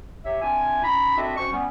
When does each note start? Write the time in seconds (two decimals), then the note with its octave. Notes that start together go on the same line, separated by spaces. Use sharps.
0.25 C3 G4 C#5 E5
0.42 C4 D4 F4 E5 G#5
0.84 C#4 D#4 A#5 B5
1.16 C4 D4 F#4 A4 D#5 E5
1.37 C#4 F#4 C5 C#6
1.52 G3 B3 C#4